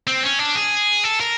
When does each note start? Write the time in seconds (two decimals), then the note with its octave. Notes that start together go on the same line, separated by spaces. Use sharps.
0.07 C4
0.23 C#4
0.39 D4
0.55 G#4
1.04 A4
1.20 A#4